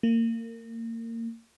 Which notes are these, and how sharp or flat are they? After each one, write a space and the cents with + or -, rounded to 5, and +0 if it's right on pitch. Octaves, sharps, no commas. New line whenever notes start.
A#3 -30